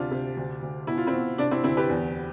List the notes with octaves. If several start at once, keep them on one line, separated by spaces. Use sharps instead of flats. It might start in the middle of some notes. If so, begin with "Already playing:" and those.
Already playing: D2 C3 D4 F4
C3
D2
D2
B2 E4
F4
C4 E4
B2
C3 D4
C4 E4
D2 C4 E4
G4 B4
E2